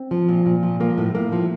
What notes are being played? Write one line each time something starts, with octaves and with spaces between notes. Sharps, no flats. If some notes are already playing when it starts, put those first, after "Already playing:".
Already playing: C4
F3
A#2
A#2
F3
F3 A#3
A2
A2 A#3
F3